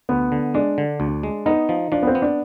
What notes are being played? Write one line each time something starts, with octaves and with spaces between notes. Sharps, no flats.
D2 B3
D3
G#3 D4
D3
D2
G#3
B3 D#4
F3
F3 D4
B3
C4
B3
D4